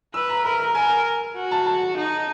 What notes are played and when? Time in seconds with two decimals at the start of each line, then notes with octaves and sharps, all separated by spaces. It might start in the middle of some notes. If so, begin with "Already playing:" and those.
0.14 B4 E6
0.29 A#5
0.45 A#4 B5
0.59 A#5
0.75 A#4 G#5
1.36 F#4
1.51 A5
1.66 A5
1.97 D#4